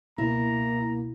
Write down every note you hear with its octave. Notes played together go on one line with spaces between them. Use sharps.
C#2 B2 A#3 E4 A#5